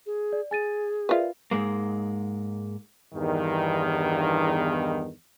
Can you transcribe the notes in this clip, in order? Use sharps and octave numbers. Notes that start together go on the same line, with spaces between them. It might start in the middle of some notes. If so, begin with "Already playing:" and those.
G#4
D5
G#4 G#5 A6 D#7
F4 A#4 B4 D5 E5
G#2 G#3 A#3
E2 G2 D#3